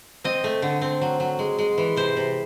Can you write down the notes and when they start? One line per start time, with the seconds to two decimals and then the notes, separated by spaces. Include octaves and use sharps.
0.24 C4 D#5
0.44 A3
0.62 D3
0.81 C4
1.01 F#3
1.20 F#3
1.39 G#3
1.59 G#3
1.78 E3
1.96 C3 C5
2.17 C3